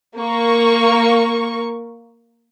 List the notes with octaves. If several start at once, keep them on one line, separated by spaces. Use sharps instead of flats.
A#3 A#4 C#6